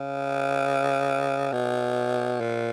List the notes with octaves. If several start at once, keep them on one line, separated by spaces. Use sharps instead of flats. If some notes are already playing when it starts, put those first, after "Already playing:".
Already playing: C#3
B2
A#2